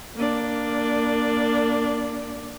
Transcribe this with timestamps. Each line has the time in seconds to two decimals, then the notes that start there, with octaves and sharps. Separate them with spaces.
0.15 A#3 D4